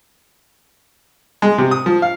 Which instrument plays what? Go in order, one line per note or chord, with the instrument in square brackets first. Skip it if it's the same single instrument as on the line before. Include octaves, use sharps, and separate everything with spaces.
[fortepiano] G#3
C3
D#6
F3
F5